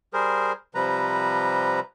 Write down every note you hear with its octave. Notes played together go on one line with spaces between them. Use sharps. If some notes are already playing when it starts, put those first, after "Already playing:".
G3 G#4 A#4 C5
C3 F3 G3 B4 A#5